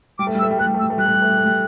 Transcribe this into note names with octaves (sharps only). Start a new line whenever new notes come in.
G3 D6
A3
G3
E6
A3
G3
A3 F#6
G3
A3
E6
G3
A3
G3 F#6
A3
G3
A3
G3
A3
G3